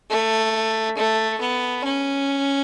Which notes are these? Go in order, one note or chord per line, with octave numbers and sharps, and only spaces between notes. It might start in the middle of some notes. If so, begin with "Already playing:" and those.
A3
A3
B3
C#4